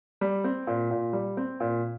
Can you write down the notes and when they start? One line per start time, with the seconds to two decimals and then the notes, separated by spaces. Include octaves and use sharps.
0.21 G3
0.44 C4
0.67 A#2
0.91 A#2
1.13 G3
1.37 C4
1.60 A#2